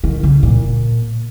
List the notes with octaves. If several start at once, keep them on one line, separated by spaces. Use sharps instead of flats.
D#3
C#3
A#2